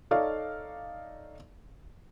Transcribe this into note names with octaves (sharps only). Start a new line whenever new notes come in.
D#4 A4 C#5 D5 F5